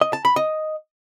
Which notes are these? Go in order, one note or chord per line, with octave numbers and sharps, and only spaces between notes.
D#5
A5
B5
D#5